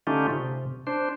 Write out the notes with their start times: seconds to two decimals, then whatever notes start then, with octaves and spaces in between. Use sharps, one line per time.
0.07 D3 A3 C#4 D#4 F4 G4
0.30 C3
0.87 D4 C5